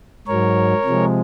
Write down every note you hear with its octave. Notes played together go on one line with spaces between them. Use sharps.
G#2 F#3 A#4 C#5
C3 F3 G#3